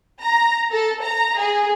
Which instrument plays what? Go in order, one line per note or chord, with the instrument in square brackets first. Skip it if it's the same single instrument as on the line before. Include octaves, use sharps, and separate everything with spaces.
[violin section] A#5
A4
A#5
G#4